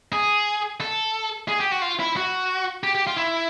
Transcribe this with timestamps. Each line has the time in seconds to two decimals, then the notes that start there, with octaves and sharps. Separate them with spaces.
0.13 G#4
0.81 A4
1.48 G#4
1.60 G4
1.71 F#4
1.82 F4
1.99 E4
2.16 F#4
2.83 G4
2.95 G4
3.07 F4
3.17 E4